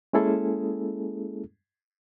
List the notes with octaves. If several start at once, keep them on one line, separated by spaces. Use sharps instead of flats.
G#3 A#3 C#4 E4 G#4 A4